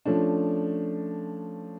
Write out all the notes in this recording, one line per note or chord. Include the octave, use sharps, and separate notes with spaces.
F3 A3 C#4 D4